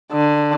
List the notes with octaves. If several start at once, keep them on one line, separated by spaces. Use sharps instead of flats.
D3